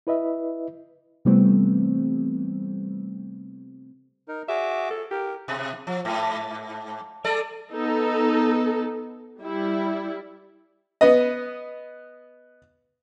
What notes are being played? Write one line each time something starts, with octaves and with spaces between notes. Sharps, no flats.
E4 B4 D#5 E5
C3 E3 G3 A3 B3 C4
D#4 A#4
F#4 G#4 E5 D6
A4
G4 A#4
B2
F3
G#2
G#3 A4 D5
B3 D#4 A4
G3 E4
B3 B4 D#5